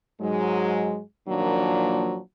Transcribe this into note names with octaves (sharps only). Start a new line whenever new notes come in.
G#2 F#3 G#3
A#2 D#3 F3 F#3 A#3 D4